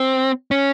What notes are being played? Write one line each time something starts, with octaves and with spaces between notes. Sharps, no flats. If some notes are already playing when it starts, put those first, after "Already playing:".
Already playing: C4
C#4